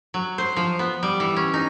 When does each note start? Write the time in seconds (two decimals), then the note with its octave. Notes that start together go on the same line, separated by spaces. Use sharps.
0.14 F#3
0.38 C5
0.56 F3
0.79 B3
1.03 G3
1.20 E3
1.36 C#4
1.54 D#4